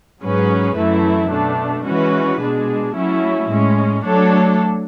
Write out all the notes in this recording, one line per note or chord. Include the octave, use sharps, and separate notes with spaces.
G#2 F#3 C#4 G#4 B4
F#2 E3 A3 E4
B2 A3 D4
E3 G#3 C#4 F#4 B4
B2 G#3 D4 G#4
F#3 A3 C#4 E4
A2 G#3 C#4
F#3 A3 D4 A4 C#5